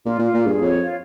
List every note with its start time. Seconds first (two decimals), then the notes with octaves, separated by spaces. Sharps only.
0.05 A#2 F4
0.19 A#2
0.24 F4
0.34 A#2
0.42 G2 G#4
0.61 F2 C#5
0.79 F4